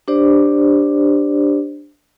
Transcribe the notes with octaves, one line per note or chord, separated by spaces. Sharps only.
D4 G4 C5 D5